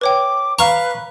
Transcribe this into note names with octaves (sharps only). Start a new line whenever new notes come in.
B4 C#5 G5 D6
B4 F5 A#5 C#6